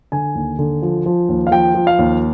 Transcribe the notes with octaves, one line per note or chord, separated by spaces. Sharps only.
D3 G#5
D#2
D3
F3
F3
D#2
F5
F3 G5
F3
F5
D#2